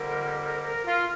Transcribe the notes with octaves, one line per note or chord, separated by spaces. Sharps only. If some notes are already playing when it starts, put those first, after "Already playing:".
Already playing: F2 D3 G3 A#3 A#4
A#4
A#4
F4